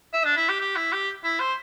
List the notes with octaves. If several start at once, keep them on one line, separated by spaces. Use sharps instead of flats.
E5
D4
E4
G4
G4
E4
G4
E4
C5